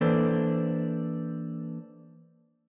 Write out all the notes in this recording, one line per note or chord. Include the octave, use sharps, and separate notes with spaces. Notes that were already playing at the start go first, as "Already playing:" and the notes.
E3 A#3 D4 A4 B4 C5